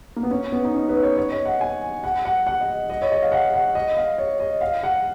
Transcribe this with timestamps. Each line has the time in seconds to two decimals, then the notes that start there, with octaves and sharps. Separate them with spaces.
0.16 A#3
0.23 B3
0.31 C#4
0.52 B3
0.64 D#4
0.74 C#4
0.89 B4
1.03 C#5
1.17 C#5
1.32 D#5
1.45 F#5
1.61 G#5
2.04 F#5
2.25 F#5
2.47 F#5
2.61 D#5
2.90 D#5
3.02 C#5
3.12 D#5
3.22 F5
3.32 F#5
3.54 F#5
3.75 D#5
3.97 F5
4.18 C#5
4.40 D#5
4.61 F5
4.83 F#5